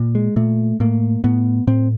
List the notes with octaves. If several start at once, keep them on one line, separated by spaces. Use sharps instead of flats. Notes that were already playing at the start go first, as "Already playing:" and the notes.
Already playing: A#2
G#3
A#2 A3
A2 A#3
A2 B3
A2 C4